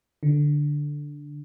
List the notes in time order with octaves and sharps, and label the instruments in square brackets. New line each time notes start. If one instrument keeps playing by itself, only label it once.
[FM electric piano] D3